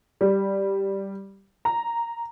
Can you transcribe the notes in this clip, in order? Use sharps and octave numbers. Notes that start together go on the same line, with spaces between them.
G3
A#5